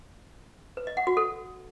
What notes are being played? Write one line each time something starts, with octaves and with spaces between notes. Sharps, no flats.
B4
D#5
F#5
F#4
A4